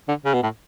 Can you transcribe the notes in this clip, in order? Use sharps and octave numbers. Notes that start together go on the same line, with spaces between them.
D3
C#3
B2
A2